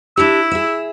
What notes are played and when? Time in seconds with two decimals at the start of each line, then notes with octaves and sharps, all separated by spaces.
0.17 D4 E4 G4 E6
0.51 G#4 E5